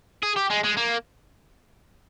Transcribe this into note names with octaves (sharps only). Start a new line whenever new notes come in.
G#4
G4
G#3
G#3
A#3